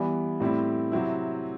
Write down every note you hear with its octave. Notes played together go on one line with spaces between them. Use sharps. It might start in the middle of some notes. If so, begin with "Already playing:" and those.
Already playing: E3 G3 B3
A2 G3 C4 E4
C3 F#3 C4 E4